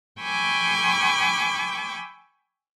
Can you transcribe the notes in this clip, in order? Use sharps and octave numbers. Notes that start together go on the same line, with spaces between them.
G5 G#5 B5 C#6 D6 E6